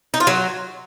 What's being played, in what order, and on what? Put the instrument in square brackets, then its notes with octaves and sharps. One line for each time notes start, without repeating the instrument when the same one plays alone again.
[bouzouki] D#4
F4
F#3